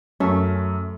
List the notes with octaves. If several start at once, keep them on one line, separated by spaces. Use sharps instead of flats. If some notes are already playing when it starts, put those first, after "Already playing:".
F#2 A3 C#4